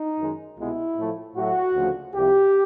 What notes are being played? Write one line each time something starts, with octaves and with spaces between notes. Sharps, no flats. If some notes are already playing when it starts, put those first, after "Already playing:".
Already playing: D#4
F#2 D#3 G#3
C2 B2 G#3 B3 E4
A2 F3 A3
A2 F#3 A3 F#4
D2 C#3 F3 A3
C2 C3 F3 G4